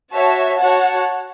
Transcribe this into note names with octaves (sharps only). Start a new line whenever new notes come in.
F#4 C#5 E5 A5
F#4 C#5 F#5 A5